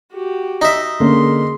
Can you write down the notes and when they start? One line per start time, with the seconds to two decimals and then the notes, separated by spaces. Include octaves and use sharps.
0.12 F#4 G4
0.62 D#4 E5
1.00 D3 G#3 A#3 C#4 C6